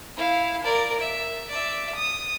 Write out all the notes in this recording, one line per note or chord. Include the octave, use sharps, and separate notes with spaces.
E4 F5
A#4 D5
E5
D5 E5
D#6